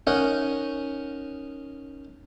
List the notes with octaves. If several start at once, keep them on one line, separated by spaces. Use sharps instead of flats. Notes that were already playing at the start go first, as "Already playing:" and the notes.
C#4 D#4 A#4 C#5 D#5 F#5